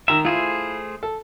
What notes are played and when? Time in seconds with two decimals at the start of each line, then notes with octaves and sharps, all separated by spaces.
0.08 D#3 E5 A#5
0.25 A3 E4 F4 G#4 C5
1.03 A4